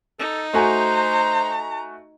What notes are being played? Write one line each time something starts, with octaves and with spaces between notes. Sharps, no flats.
D#4 A4
A3 F#4 C5 G#5 A#5